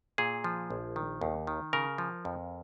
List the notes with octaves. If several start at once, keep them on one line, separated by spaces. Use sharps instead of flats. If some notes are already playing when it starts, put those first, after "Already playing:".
A#2 G#4
F3
A#1
D#3
D#2
D#3
C#3 A#4
F3
F2